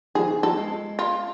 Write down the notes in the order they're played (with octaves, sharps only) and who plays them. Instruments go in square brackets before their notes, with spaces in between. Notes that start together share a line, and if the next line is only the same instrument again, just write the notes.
[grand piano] F3 [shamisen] G#4
[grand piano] E3
[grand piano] F3 [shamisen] A4
[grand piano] G#3
[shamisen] F4